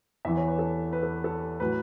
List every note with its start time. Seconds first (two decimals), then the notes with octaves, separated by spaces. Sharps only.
0.25 E2 E3 E5
0.37 C#5
0.47 B4
0.59 A4
0.93 B4
1.03 A4
1.24 A4
1.60 A2 F#3 B4